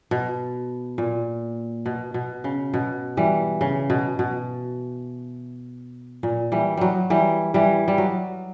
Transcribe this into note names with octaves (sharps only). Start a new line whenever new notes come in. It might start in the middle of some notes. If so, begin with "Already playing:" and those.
B2
A#2
B2
B2
C#3
B2
E3 G3
C#3
B2
B2
A#2
E3 G3
F#3 G3
E3 G3
E3 G3
G3
F#3